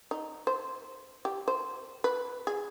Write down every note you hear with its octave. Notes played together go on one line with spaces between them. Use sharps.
D#4
C5
G4
C5
B4
G#4